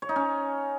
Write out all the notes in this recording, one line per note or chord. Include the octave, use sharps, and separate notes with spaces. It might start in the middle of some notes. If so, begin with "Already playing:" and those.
C#5
D#4
C#4